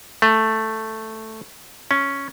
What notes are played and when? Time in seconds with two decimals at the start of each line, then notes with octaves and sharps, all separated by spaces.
0.22 A3
1.91 C#4